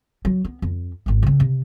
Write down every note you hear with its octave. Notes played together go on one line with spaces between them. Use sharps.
F#3
B3
F2
G#1 F2
C#3 C4
C3